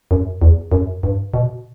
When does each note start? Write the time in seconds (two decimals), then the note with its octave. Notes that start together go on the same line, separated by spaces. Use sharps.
0.11 F#2
0.42 E2
0.72 F#2
1.03 G2
1.34 B2